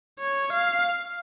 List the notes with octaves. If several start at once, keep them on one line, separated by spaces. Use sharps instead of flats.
C#5
F5